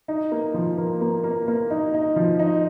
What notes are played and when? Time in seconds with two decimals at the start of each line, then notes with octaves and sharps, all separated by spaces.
0.08 D#4
0.32 A#3
0.54 F3
0.78 A#3
1.01 A#3
1.24 A#3
1.48 A#3
1.71 D#4
1.94 D#4
2.16 F3
2.39 D#4